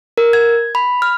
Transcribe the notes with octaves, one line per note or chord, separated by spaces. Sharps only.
A#4
G#6
B5
F6